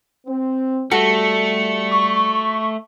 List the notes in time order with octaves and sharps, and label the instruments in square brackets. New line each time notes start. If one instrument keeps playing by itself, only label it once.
[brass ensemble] C4
[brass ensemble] G3 [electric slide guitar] A3 [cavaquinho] F#4 A4 [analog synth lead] C#7
[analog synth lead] C#6